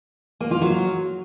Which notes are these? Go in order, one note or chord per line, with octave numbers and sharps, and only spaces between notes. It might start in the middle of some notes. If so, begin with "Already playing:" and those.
A#3
F4
F#3